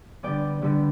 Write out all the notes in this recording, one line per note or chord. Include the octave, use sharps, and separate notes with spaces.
D3 G3 B3 D5 G5
D3 G3 B3